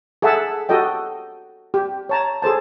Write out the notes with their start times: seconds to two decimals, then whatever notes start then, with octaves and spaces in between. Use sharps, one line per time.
0.22 G#4 A4 E5 F#5 A5
0.69 F#4 G4 A4 D#5 G5
1.74 G4
2.09 C#5 A5 A#5
2.42 G#4 A4 C5 A5